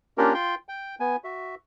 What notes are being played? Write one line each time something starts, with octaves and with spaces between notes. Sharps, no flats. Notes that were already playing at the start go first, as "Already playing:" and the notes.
A#3 C#4 D4 F4 G4 A#4
F4 G5 C6
G5
B3 G#5
F#4 E5